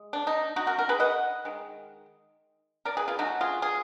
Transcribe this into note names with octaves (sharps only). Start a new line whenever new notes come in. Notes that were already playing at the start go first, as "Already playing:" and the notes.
Already playing: G#3
D4
D#4
D#4 F#4
F#4 A#4
F#4 A#4
G#4 B4
D#5 F#5
D#3 G#3
A#4 D5
G#4 B4
F4 G#4
D3 F#3 A#3 D#4 F#4
F4 G#4
F4 G#4